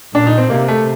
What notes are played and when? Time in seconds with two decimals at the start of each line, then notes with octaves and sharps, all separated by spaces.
0.14 A#2 D4
0.27 D#4
0.38 C4
0.50 C3 A#3
0.68 A3